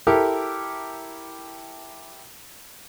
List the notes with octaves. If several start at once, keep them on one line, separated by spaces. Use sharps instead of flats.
E4 G4 A4 A#4